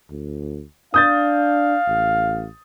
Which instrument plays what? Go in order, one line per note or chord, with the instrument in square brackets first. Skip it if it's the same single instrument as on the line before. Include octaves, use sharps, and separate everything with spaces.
[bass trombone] D2
[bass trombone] D4 [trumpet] F5 [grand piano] D#6 G6 A6
[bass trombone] A1